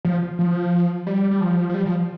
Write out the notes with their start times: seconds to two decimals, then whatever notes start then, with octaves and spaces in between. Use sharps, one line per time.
0.05 F3
0.39 F3
1.07 G3
1.31 G3
1.41 F3
1.69 F3
1.74 G3
1.86 F3